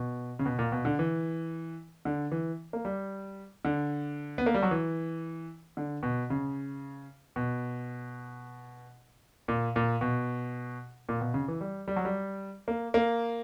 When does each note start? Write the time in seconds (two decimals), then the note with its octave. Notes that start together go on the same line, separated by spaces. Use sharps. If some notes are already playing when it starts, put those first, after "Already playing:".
Already playing: B2
0.39 C#3
0.46 B2
0.59 A#2
0.72 B2
0.85 D3
0.99 E3
2.05 D3
2.32 E3
2.73 A#3
2.85 G3
3.65 D3
4.38 B3
4.46 A#3
4.54 G3
4.62 F#3
4.71 E3
5.77 D3
6.03 B2
6.30 C#3
7.36 B2
9.48 A#2
9.76 A#2
10.01 B2
11.09 A#2
11.21 B2
11.34 C#3
11.48 E3
11.61 G3
11.88 G3
11.96 F#3
12.05 G3
12.68 A#3
12.94 A#3